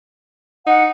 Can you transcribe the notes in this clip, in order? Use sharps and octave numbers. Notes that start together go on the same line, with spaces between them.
D#4 F#5